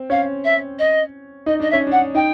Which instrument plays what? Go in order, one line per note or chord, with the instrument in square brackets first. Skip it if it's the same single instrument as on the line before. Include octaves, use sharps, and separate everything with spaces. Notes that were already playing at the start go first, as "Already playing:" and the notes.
Already playing: [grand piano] C4
[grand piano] C#4 [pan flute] F5
[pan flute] E5
D#5
[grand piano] D#4 [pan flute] D#5
[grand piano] D4 [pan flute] D#5
[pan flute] E5
[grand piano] C#4
[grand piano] D4 [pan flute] F#5
[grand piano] D#4 [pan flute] G5